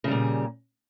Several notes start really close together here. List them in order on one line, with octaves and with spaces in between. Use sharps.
C#3 G3 A#2